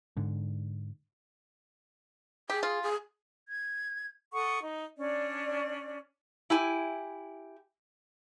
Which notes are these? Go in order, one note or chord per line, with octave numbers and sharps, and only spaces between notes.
G#2 D3
G4 G#4
F4
G#4
G#6
A4 F#5 C#6 D#6
D#4
C#4 D4 D5
E4 G4 G#5